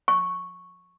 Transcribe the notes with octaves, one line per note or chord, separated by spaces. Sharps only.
C#6